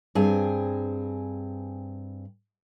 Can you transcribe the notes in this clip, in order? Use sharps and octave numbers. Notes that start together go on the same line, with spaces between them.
G2 C4 G#4 G#5